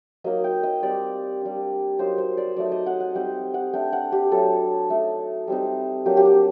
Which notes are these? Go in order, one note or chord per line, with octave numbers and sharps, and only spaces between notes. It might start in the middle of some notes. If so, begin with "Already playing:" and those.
F#3 A#3 D#4 D#5
G5
D#5
G3 C4 D#4 D5
G3 D4
F#3 A#3 D#4 C5
C5
D5
F#3 A3 D#4 D5
D#5
F#5
F#5
G3 C4 D#4 G5
F#5
A3 D4 G5
F#5
G4
F#3 A3 D4 A4
A3 D#4
G3 C4 D#4
F#3 A#3 D4 G4
G4
F#4